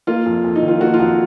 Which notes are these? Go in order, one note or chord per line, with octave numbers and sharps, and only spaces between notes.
A#3 F4
F2
F2
D#4
D#3
F4
A#3 F#4
F4
F2 F#4